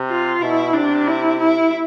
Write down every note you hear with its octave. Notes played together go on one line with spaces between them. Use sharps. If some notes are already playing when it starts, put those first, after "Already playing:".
Already playing: C3
F4
B2 E4
C3 D4
E4
E4